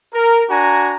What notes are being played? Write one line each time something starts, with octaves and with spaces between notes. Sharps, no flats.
A#4
D4 F#4 G#5 A#5